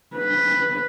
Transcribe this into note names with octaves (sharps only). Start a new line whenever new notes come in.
B4